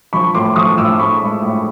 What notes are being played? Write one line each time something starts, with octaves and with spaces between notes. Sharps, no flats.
F3 B5 C#6
A2 C6 D6
F3 C#6 D#6
A2 D6 E6
A2 B5 C#6
G#3
A2